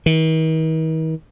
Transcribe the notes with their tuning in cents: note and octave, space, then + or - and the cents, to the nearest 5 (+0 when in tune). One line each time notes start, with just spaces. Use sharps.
D#3 +45